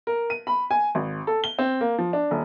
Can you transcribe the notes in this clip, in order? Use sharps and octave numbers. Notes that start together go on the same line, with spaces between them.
A#4
D#7
B5
G#5
G#1
A4
G7
C4
A#3
F3
D4
D#1